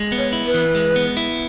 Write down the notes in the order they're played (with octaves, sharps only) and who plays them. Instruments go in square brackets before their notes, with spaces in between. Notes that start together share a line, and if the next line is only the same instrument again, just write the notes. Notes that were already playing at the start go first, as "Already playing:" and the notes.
Already playing: [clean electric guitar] G#3
B3
[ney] C#5
[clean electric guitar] E4
[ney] B4
[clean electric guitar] E3
G#3
B3
E4